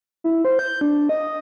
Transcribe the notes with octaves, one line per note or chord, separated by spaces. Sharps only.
E4
C5
G6
D4
D#5